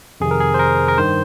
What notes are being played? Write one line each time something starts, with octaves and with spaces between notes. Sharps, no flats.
F2 C3 D#3 G#4
A#4
G#4
C5
A#4
A#4
G2 D#3 C5